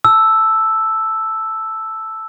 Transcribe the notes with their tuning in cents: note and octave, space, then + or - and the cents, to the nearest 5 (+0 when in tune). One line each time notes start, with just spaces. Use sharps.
A5 +0 E6 +0